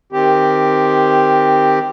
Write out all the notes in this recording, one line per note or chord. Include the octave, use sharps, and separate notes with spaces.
D#3 C4 G4